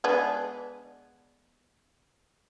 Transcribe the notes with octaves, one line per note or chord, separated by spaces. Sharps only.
G#3 B3 D4